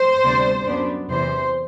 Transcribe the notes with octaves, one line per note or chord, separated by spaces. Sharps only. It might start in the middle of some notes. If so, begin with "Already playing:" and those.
Already playing: C5
D2 C3 G3 B3 D4
F#2 F#3 B3 D4
E2 C3 E3 C5